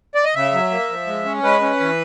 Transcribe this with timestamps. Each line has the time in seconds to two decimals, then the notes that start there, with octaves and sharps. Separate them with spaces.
0.15 D5
0.25 D#5
0.35 C#3 E5
0.53 F#3
0.71 A#3
0.89 F3
1.07 G#3
1.25 C#4
1.43 G#3 B4
1.61 C#4
1.80 E3